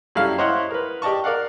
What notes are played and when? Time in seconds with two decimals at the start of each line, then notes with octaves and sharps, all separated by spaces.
0.15 F#2 G3 E4 A4 F5
0.38 E4 C5 C#5 D#5 F#5
0.71 A#4 B4
1.02 G4 D5 D#5 A5 C#6
1.24 A#4 D5 F5 F#5